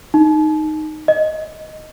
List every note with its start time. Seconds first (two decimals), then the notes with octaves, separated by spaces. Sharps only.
0.14 D#4
1.08 D#5